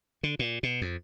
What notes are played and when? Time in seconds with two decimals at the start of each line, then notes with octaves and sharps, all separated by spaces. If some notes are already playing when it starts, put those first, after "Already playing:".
0.23 D3
0.39 A#2
0.63 B2
0.82 F2